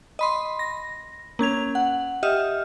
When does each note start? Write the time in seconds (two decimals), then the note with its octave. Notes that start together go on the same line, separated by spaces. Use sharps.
0.19 D#5 B5 C6
0.59 A#6
1.39 A#3 C#4 G#6 F7
1.75 F#5
2.23 G4 D#5 E5 F6